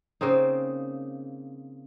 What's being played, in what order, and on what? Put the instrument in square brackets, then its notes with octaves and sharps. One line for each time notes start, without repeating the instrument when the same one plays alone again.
[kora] C#3 A#3 C4 D#4